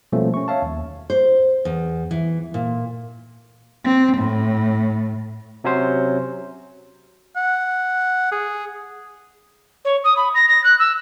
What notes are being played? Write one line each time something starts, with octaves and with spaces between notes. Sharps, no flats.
B2 F3 G3 A3 A#3 C#4
C#4 C#6
C#5 E5 F5 A5
D#2
C5
E2
E3
A#2
C4
A2
C3 F#3 C#4 C5
F#5
G#4
C#5
D#6
B5
A#6
A#6
F#6
E6